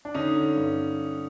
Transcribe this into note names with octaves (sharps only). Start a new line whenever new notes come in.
D4
D3 C#4 D#4
D3
G2